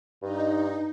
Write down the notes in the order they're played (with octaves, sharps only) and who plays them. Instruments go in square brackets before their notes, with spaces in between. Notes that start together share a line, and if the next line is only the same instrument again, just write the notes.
[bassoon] G2 [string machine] D#4